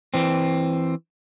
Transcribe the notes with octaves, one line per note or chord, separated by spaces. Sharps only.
E3 C4